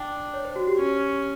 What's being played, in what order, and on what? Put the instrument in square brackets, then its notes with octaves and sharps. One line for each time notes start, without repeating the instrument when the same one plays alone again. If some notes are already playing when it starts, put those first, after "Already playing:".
Already playing: [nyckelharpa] D4 [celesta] G5
[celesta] C#5
C5
F#4
G4
[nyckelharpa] C#4